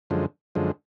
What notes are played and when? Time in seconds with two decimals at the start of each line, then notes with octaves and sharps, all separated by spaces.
0.10 F#2 D3 F3 G#3
0.55 F#2 D3 F3 G#3